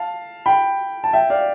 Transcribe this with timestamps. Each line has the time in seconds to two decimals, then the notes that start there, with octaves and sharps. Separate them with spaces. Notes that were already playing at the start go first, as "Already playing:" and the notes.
Already playing: F5 A5
0.46 G5 B5
1.04 A5
1.13 E5 G5
1.30 D5 F5